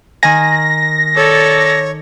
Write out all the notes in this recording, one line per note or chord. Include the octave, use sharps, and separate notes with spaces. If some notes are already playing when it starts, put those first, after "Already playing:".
D#3 G#5 A#6
A4 C#5 D5